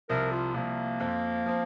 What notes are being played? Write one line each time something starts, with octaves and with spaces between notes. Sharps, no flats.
C2 C3 F3 A#4
F4
C2 C3 F3 A#3
F2 F3 C4
F3 C4